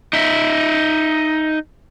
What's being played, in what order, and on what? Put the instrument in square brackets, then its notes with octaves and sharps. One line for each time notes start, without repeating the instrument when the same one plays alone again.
[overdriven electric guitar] D#4 E5